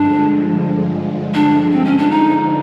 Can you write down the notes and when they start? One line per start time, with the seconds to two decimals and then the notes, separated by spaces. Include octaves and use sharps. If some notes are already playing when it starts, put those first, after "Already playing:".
Already playing: G2 D3 F3 G#3 D4
1.34 D4
1.72 C4
1.85 C#4
1.98 D4
2.11 D#4